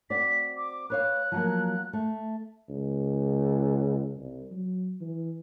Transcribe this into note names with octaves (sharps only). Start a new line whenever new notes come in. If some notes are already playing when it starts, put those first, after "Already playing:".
C4 F#4 D5 B6
D6
B4 C#5 F5 F#6
F3 F#3 A#3
A3
C#2
C2
F#3
E3